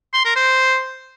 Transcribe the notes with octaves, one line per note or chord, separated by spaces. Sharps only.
C6
A#4
C5